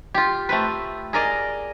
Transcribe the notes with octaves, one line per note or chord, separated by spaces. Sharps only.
F4 G4
A3 C4 B4
G#4 A#4 D5 D#5